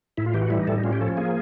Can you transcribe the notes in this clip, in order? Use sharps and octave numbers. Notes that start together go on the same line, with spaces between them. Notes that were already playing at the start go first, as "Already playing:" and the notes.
A2 E4
F4
E3 G4
F#4
G3 E4
D#4
A2 A4
D#4
C#4 F4
G4
F3 A4
A#3 G#4